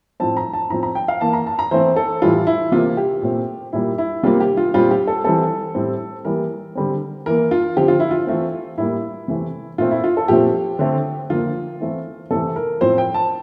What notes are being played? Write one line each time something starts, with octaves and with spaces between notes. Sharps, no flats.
A2 F3 C4 A5
A#5
A5
A2 F3 C4 A#5
A#5
G5
F5
E3 A#3 A5
A#5
A5
A#5
E3 A3 C4 C5
A4
A2 E3 G3 F4
E4
C3 E3 A#3 F4
G4
A#2 A3 C4
A#2 G3 A#3 E4
E4
C3 G3 A#3 F4
G4
F4
A#2 G3 C4 F4
G4
A4
E3 G3 C4 A4
A2 G3 C4
E3 G3 A#3 A#4
D3 G3 C4
E3 A#3 A#4
F4
D3 F3 C4 G4
F4
E4
F4
E3 A3 C4
A2 G3 A#3 E4
C3 E3 A3 C4
A#2 A3 C4 F4
E4
F4
A4
A#2 F3 A3 C4 G4
D3 A3 C4
D3 F3 A#3 F4
E3 A3 C4
C3 E3 A3 A4
A#4
A2 F3 C4 C5
G5
A5